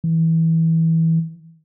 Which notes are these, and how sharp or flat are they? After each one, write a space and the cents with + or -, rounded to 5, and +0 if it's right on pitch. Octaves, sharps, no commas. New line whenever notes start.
E3 -20